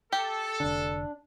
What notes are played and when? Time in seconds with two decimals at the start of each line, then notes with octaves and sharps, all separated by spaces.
0.12 G4 A4
0.60 F1 D3 D4